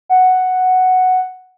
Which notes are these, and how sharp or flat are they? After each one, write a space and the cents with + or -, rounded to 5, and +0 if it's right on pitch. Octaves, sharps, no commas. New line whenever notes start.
F#5 +0